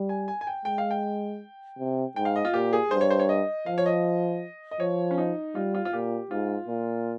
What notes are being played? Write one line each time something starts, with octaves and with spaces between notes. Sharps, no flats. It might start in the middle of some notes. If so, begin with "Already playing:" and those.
Already playing: G3
G#5
G#5
G#5
G5
G#3 G5
F5
G5
C3
G#2 G5
F5
D#5
F4
A#2 G4
G#4
G2 C5
C#5
C5
C#5
D#5
F3 F5
C#5
D#5
D#5
F3 C#5
C#4
D#4
G3 F4
F4
F4
A#2 G4
G#2 F4
A#2